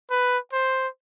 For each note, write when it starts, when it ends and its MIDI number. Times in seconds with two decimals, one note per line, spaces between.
0.11 0.38 71
0.53 0.88 72